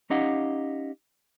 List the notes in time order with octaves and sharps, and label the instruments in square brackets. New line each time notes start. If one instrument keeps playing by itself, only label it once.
[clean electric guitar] C#4 D#4 G4 D#5 F5 F#5